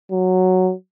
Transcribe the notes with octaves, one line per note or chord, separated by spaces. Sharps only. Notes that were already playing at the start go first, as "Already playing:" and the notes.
F#3